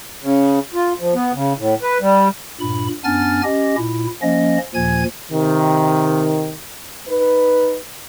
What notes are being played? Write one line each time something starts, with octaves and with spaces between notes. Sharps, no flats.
C#3
F4
F3
B3
C#3
A2
B4
G3
G2 A#2 B5
F#2 B3 D4 G#5 F6 A6
C#4 G4 D#5
A#2 E4
F3 A#3 C#4 D#5
D#2 A#2 F3 G#5 G#6
C3 D#3
D#4 B4